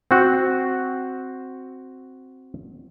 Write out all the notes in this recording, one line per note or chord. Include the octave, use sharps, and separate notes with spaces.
C4 F#4